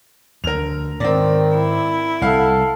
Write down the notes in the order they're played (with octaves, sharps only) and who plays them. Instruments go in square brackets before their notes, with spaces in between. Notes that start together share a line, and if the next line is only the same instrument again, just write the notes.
[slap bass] D2 [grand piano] A#4 F7
[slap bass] G#2 [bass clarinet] D#3 [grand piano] C4 D5
[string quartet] E4
[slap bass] C2 [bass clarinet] A4 [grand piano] F5 F#5